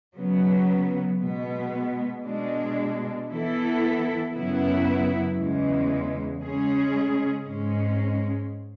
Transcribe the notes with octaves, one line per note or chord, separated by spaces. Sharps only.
C#3 F#3 B3
B2 G#3 B3
B2 G#3 D4
E3 B3 E4 A4
F#2 C#3 F#3 B3 E4
E2 C#3 E3 G#3
C#3 G#3 C#4 G#4
G#2 G#3 C#4